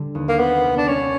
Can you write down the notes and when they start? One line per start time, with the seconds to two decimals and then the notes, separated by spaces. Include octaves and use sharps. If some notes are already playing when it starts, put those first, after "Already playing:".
Already playing: D3 G3
0.15 D#2
0.29 A#3
0.39 B3 C4
0.63 C2
0.77 D4
0.88 G3 C#4